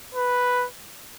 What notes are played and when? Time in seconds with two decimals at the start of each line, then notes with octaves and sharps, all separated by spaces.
0.15 B4